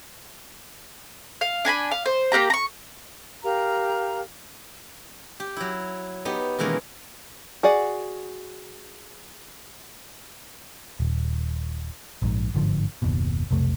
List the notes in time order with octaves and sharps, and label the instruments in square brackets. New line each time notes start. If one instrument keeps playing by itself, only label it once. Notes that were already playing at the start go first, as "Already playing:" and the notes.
[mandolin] F5
D4 G#5 A#5 B5
F5
C5
A#3 C#4 G4 A#5
A#5 C#6
[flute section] G4 A#4 F5 A#5
[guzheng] G4
F#3 E4
B3 D#4 G4
B2 D#3 E3 G#3 A#3 C#4
[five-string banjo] F#4 G#4 D5 F#5
[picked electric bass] D#1
A#1 G#2
G1 G#2 D3 F3
F#1 D#2 B2
B1 F2 C3 A3